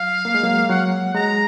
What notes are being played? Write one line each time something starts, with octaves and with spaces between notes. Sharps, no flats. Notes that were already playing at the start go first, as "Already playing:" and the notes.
Already playing: F#3 F5
A#3
G#3
F#3 A#3
F#3 F#5
G#3 A#5